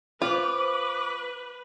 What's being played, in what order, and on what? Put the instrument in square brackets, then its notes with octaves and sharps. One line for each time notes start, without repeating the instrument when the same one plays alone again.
[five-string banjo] F4 [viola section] B4 [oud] C5 F5 [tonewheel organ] D6